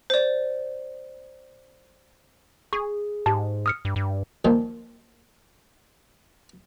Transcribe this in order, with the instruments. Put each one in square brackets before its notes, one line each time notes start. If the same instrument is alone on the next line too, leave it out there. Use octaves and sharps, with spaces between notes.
[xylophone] C5 D5
[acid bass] G#4 [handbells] C#6
[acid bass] G#2 [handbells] G4 A5
[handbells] D#6 F6 C#7
[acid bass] G2
G2
[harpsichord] A#2 D#3 F3